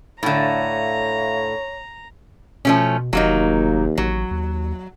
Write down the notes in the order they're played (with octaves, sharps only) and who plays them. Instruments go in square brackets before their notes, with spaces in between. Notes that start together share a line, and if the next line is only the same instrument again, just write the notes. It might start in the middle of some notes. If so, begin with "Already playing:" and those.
[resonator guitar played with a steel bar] A2 D3 [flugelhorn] C#5 [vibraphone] E5 F5 [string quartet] A#5
[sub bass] B2 [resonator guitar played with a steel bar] F3 A3 C#4
[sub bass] F1 [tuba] D#2 [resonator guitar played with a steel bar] F#3 A#3 D#4
[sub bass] A1 [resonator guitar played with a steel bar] F#3
[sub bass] D#2